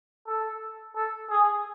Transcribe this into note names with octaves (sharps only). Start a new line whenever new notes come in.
A4
A4
G#4